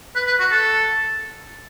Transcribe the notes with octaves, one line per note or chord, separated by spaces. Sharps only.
B4
B4
F#4
A4